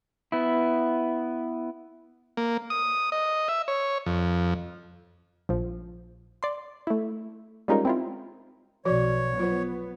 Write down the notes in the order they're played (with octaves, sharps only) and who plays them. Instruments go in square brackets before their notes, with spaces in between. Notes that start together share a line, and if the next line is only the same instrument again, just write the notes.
[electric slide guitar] B3 E4
[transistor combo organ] A#3
D#6
D#5
E5
C#5
F2
[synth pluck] A#1 F3
D5 C6
A3 E4
G3 G#3 C#4 D#4 F4 A#4
C4 E4 F4
[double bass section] B1 B2 [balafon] F3 F#4 D5 [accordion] C#5
[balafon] F#3 F4 C5 [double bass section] B3